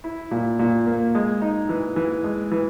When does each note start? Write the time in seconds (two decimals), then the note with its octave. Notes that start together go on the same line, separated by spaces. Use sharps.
0.04 E4
0.31 A#2
0.59 A#2
0.87 A#3
1.15 G#3
1.42 D#4
1.69 E3
1.96 E3
2.24 G#3
2.51 E3